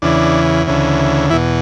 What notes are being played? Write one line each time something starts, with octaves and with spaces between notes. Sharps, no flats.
E2 C#3 E3 D4
D2 C#3 E3
E2 B2 E3 E4